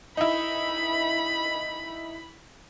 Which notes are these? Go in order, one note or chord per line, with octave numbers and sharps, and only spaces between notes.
D#4 E4 B5